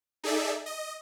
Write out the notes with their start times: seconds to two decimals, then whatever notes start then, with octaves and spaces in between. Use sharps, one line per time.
0.24 D#4 G#4 A4 D5 E5
0.66 D#5